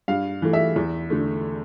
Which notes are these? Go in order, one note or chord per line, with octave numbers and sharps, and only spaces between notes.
G2 F5
E3 A3
E5
E2
D3 A3